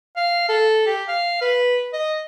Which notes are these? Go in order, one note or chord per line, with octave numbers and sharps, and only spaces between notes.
F5
A4
G4
F5
B4
D#5